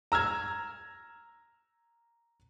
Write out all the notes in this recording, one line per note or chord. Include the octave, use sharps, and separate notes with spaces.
A#5 E6 F6 G#6